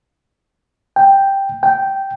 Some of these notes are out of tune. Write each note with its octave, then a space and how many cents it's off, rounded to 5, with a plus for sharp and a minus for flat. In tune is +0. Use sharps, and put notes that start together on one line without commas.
G5 +5
G5 -5